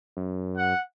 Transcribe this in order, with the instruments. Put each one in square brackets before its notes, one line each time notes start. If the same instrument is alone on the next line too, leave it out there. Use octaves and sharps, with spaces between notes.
[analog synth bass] F#2
[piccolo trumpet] F#5